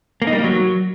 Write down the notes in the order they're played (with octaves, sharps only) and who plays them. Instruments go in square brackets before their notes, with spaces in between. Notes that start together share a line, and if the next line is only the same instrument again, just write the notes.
[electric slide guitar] A#3
D#4
G3
A#3
F#3